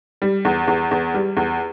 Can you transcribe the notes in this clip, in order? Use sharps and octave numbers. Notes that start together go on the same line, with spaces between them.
G3
E2
E2
E2
G3
E2